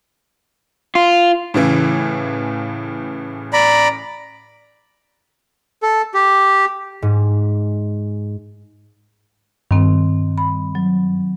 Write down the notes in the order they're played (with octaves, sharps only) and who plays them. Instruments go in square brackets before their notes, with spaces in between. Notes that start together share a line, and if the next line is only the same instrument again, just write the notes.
[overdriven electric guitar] F4
[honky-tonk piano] A2 C#3 E3
[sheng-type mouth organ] D5 A#5 B5
[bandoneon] A4
G4
[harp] G#2
[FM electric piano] G2 [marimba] D#3 C4
[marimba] B5
F#3